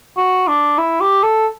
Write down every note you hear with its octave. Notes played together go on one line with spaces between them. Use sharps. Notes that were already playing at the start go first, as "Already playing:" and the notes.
F#4
D4
E4
G4
A4